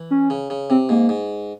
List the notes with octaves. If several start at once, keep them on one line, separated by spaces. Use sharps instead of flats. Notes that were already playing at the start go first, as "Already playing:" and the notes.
Already playing: E3
C#4
C#3
C#3
C3 C4
G#2 A#3
G#2